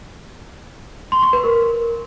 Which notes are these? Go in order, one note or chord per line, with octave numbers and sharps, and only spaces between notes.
C6
C#6
B4
A#4